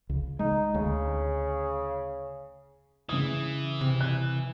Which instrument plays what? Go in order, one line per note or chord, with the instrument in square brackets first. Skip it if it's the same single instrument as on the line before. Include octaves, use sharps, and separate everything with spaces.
[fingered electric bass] C#2
[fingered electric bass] G#3 [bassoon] D#4
[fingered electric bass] D2 [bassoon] C#3
[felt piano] C#3 D#6 [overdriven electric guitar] E3
[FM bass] C3
[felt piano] F#6